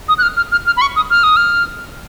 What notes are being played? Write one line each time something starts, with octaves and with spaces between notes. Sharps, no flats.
D#6
F#6
F6
F6
F6
F6
B5
C#6
D#6
F6
D#6
F6